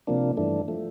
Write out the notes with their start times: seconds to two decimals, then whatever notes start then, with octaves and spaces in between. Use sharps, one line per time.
0.07 C3 F3 A#3 D4
0.37 G2 E3 A3 D4
0.68 F3 A3